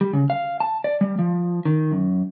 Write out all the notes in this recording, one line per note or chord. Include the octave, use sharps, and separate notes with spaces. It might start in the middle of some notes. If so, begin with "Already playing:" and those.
G3
C#3
F5
A5
D5
G3
F3
D#3
F#2